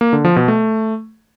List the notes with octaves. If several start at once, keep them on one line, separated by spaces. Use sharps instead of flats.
A#3
D3
F3
B2
A3